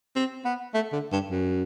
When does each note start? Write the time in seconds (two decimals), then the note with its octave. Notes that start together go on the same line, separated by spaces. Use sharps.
0.16 C4
0.45 B3
0.74 A3
0.93 D3
1.12 G2
1.30 F#2